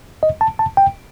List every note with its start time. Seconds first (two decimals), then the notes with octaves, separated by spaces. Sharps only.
0.23 D#5
0.41 A5
0.59 A5
0.77 G5